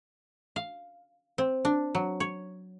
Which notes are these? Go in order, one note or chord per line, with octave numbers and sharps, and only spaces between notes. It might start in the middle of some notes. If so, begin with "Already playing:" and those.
F5
C4
D4
F#3
C#5